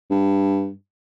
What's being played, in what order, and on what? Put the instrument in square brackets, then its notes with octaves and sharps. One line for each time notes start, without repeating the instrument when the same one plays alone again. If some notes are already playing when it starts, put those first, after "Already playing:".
[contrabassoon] G2